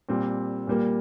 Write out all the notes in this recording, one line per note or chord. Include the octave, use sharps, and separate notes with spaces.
A#2 G3 C4
A#2 G3 A#3